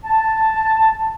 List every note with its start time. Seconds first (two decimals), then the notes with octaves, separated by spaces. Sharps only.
0.04 A5